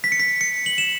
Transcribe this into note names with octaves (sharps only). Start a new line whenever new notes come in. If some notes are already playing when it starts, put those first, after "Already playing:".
B6
C#7
B6
C#7
F#7
E7